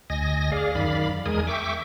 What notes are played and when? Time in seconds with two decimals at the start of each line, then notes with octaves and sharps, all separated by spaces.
0.10 D2 D#5 G#5 A#6
0.52 G#4 D5 F5
0.75 F#2 D#3 D5 F5 B5
1.26 E2 G#3 A#4 G#5 D#6
1.47 E5 G5 C#6 D6